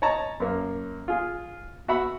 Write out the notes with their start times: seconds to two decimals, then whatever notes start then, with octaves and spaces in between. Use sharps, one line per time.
0.02 C#5 D#5 A5 A#5
0.40 F#2 A#3
1.08 F4 G#4
1.88 F#4 E5 F#5 B5